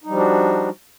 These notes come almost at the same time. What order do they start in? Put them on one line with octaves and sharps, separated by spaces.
D#4 G3 F3 D4 F#4